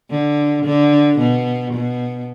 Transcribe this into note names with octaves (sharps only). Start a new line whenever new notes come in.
D3
D3
B2
B2